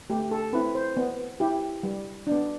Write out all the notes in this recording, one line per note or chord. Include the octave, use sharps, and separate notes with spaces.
A3 G4
A4
C4 E4 B4
C5
B3
E4 G4
G3
B3 D4